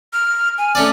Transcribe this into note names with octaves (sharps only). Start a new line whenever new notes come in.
F6
G#5
A3 C#4 D5